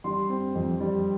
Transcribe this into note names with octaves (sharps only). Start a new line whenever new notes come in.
G3 C6
C4
F2
G3